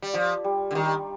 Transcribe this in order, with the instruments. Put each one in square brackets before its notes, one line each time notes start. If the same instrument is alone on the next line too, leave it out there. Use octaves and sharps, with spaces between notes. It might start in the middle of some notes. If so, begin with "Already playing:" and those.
[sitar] G3
[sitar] F3 [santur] F4
[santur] G3
[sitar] D3
[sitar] D#3 [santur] G3